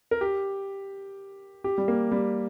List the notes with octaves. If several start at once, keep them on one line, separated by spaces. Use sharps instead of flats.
A#4
G4
G4
G3
A#3
G3